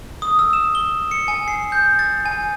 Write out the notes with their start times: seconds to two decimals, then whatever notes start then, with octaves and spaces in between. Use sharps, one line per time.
0.22 D#6
0.39 E6
0.53 E7
0.75 G7
1.11 C#7
1.28 G#5
1.48 C7
1.72 G6
1.99 A6
2.26 G#5